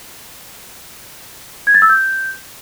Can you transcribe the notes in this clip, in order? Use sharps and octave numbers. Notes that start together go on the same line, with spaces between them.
G#6
A6
E6
G6